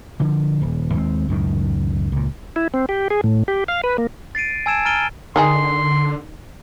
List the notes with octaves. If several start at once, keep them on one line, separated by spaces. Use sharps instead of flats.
D3 F3
D#1
D#2 G#3 A3 C4
C#2 F#2 A2 D#3
C#2 A#2
E4
C4
G4
G#4
A2
G4
F5
B4
A#3
A6 C7 D7 D#7
G#5 A5 E6 G#6 D7 E7
A#5 F6 A6 D7 D#7 G7
D3 D#3 D#4 G#4 C6